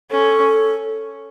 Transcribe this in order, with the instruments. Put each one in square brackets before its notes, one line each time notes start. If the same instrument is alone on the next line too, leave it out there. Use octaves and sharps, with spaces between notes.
[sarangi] C#4 [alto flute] A4